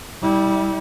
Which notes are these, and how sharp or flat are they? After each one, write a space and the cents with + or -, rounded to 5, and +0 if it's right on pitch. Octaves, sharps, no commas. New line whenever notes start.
G3 +0 E4 -35